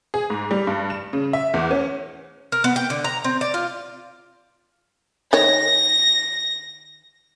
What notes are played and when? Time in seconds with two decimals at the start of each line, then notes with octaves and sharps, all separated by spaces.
0.14 G#4
0.30 G#2
0.51 G3
0.67 G2
0.90 E7
1.13 C#3
1.33 E5
1.54 E2
1.71 C#4
2.52 A#4
2.64 B3
2.76 G5
2.90 D3
3.04 A#5
3.24 C4
3.41 D5
3.54 F4
5.33 D#3 C#5 A#6